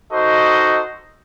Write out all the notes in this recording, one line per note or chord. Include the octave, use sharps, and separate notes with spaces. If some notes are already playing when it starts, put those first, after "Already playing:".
D#4 F#4 A4 C5 D#5